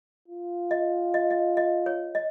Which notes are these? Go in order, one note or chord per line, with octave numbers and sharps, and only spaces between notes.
F4
D#5
D#5
D#5
D#5
C#5
D#5